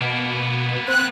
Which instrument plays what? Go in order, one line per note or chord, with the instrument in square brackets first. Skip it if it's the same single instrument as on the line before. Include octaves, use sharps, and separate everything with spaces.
[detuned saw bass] B2 [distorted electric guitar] A#3 B3
[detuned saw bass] C4 [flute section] F#6